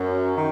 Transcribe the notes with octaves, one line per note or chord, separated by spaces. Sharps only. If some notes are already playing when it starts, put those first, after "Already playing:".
Already playing: F#2
D#3